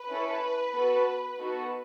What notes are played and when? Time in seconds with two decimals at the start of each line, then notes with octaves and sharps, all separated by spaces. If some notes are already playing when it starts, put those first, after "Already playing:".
Already playing: B4
0.09 C#4 E4 A4
0.73 B3 F#4 A4
1.39 B3 D#4 F#4 A4